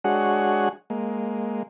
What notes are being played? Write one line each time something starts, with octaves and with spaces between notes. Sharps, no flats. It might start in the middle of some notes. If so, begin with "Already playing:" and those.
G#3 D4 F#4 G#4 C#5 F#5
G#3 A#3